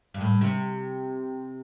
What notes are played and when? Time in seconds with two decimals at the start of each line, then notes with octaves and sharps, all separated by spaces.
0.14 G2
0.21 A2
0.41 C3